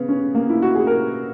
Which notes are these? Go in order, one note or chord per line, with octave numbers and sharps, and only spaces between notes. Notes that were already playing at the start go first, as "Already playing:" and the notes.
Already playing: C#3 B3
C#4
A#3
E4
F#4
G#4
A#4